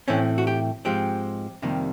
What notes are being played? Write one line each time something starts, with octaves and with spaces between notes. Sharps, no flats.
A2 E3 A3 C4 C#4
F#4
G4
G#2 F3 G#3 C4 G4
F2 C3 D#3 G3 A#3